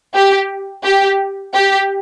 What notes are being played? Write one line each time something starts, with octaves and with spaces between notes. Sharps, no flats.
G4
G4
G4